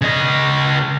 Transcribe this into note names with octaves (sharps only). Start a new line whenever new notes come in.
C#3 D#5